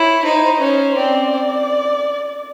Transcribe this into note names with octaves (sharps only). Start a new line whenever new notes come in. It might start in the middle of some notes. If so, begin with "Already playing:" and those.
Already playing: E4 C#5
D#4 C5
C#4 C5
C4 D5